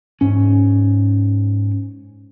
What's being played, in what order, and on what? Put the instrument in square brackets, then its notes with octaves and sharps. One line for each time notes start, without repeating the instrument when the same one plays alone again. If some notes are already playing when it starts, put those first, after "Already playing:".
[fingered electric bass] G#2 C#4